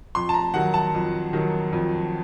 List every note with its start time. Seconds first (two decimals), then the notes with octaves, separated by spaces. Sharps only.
0.15 F2 C6
0.29 A5
0.34 A#5
0.54 D#3 F#3 F#5
0.74 A5
0.94 F2
1.33 D#3 F#3
1.73 F2